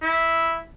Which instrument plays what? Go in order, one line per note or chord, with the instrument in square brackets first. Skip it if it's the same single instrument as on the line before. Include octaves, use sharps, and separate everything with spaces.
[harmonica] E4